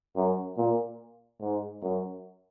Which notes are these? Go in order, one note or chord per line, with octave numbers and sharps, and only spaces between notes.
F#2
A#2
G#2
F#2